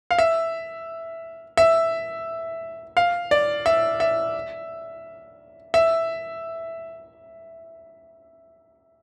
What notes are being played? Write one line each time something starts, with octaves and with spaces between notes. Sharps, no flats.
F5
E5
E5
F5
D5
E5
E5
E5